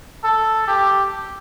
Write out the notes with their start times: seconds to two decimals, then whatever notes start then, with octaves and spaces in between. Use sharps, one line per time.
0.24 A4
0.68 G4